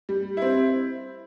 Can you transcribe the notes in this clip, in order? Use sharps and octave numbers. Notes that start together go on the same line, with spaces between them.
G3
C4 E4